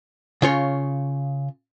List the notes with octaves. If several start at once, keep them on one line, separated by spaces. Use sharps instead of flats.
C#3 F4 C#5